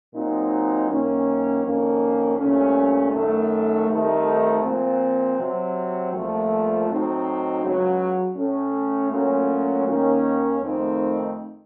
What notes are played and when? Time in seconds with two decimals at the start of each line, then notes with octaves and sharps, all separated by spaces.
0.14 A#2 F#3 C4 D#4
0.89 F#2 D#3 A#3 C#4
1.63 F2 D#3 A#3 C#4
2.37 C2 A#2 A3 C#4
3.12 F#2 D#3 A3
3.87 C2 C3 D#3 A3 D#4
4.62 A#2 F3 C4
5.38 C3 F#3 C4
6.12 C2 A#2 F3 A3
6.87 A2 F#3 C4 D#4
7.62 C#2 C#3 F#3
8.36 A2 A3 C#4
9.12 A#2 F#3 A3 C#4
9.87 D#2 D#3 A#3 C#4
10.62 F2 D#3 A3 C4 D#4